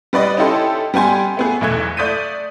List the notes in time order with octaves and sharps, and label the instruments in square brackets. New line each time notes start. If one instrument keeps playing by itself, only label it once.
[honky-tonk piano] G3 B4 D5 D#5
C#4 D#4 E4 G4 A4 C6
G3 B3 G4 G#5 C6
A3 B3 G#4
B1 E2 A3 F#6 G#6
A3 D5 D#6 G6 B6 D#7